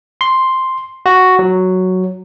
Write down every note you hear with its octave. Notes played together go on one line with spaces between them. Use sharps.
C6
F#4
F#3